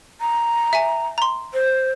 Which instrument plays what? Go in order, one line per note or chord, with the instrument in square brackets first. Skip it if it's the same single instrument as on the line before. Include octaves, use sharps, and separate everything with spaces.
[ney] A#5
[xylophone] E5 G#5
A#5 C6
[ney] C5